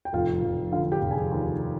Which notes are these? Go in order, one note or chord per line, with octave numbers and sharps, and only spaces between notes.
G5
F1 F4 F5
F1
D3 F4 F5
G4 G5
F1
G#4 G#5
D#2